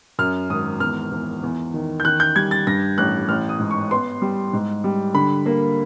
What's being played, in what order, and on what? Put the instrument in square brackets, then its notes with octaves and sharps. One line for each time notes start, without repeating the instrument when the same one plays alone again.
[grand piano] F#2 F6
G#1 D#6
E2 F6
E2
E2
D#3
G6
D#3 F#6
G6
G3 G#6
A6
G2 A#6
A1 F#6
A1 F6
D#6
G#2
C#6
B3 C6
G3
G#2
G3
D3 B5
A#3